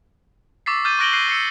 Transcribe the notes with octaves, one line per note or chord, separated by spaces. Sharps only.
C#6 D6 E6 A6 B6 C7
D6 F6 G6 A6 D#7
C#6 F#6 A#6 D7 F#7 G7
F#6 C7 D#7
E6 C7 C#7